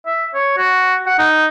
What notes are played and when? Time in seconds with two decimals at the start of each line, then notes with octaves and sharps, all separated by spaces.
0.06 E5
0.34 C#5
0.58 F#4
1.06 F#5
1.19 D#4